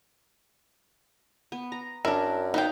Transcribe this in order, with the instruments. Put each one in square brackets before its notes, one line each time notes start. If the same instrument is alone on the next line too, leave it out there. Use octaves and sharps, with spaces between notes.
[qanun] B3
A#5
[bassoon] F#2 [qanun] D4 A#4 [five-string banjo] E4
[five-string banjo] B3 G5 [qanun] D#4 C5 F5